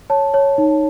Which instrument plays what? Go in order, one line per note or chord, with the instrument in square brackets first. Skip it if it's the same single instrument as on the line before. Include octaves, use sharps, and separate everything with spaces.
[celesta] C#5 A5
C#5
D#4